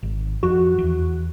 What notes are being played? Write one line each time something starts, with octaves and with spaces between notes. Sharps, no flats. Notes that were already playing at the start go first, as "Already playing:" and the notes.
G#1
F2 F#4
E2